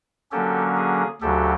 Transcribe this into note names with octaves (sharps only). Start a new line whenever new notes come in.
D3 F#3 A#3 C#4 G4 A4
G#4
D2 C#3 F#3 G4 A4